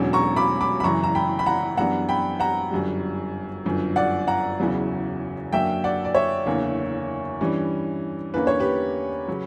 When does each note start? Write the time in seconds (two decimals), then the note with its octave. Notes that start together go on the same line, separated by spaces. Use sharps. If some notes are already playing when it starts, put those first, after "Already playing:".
Already playing: E1 E2 D3 F#3 C#4
0.13 A#5 C#6
0.36 B5 D6
0.61 B5 D6
0.80 B5
0.84 F#1 F#2 E3 A#5 C#6
1.03 A#5
1.15 G5 B5
1.39 B5
1.46 F#5 A#5
1.77 F#2 E3 G3 B3 D4 F#5 A#5
2.09 G5 B5
2.40 F#5 A#5
2.71 G1 F#2 D3 G3
3.65 G1 F#2 D3
3.96 D5 F#5
4.27 F#5 A#5
4.59 F#1 E2 C#3 F#3 B3
5.53 F#2 D3 F#3 A#3 D4 E5 G5
5.84 D5 F#5
6.05 D5
6.15 C#5 E5
6.46 F#1 E2 D3 A#3
7.41 G2 E3 G3 C#4
8.34 E2 D3 A#3 C#4 B4
8.47 C#5
8.60 G4 B4
9.28 C#3 F#3 C#4